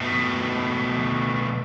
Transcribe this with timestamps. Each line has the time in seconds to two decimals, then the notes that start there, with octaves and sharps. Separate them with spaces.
0.01 B2 A3